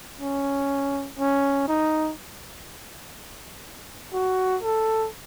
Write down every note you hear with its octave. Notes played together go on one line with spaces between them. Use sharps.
C#4
C#4
D#4
F#4
A4